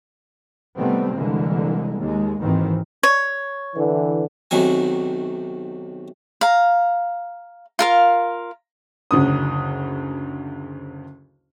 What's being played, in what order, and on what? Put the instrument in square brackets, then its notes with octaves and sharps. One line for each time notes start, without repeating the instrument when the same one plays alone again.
[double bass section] C3 D#3 G3 A3 B3 C4
C2 D3 E3 G#3 A#3
D#2 G#3
G#1 D#2 D#3 E3 C4
[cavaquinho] C#5
[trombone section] D3 E3
[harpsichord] B1 C3 D#3 F#3 G#5
[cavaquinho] F5 A#5
F4 A#4 F5
[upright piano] F#1 D2 C#3 D#6